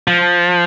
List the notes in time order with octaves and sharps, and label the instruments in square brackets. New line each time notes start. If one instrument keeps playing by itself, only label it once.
[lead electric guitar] F3